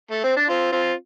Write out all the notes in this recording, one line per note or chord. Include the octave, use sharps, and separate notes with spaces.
A3
C4
D4
C4 F4
C4 F4